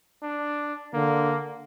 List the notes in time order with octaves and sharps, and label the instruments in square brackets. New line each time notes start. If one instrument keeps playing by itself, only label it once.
[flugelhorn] D4
[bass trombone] D3 [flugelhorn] A#3